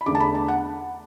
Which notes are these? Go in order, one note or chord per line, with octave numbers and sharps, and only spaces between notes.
B5
E2 D3 A3 D6
A5
B5
A5
F#5